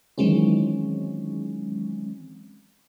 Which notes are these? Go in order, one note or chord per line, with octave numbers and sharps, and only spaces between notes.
D#3 E3 F#3 G#3 C4 C#4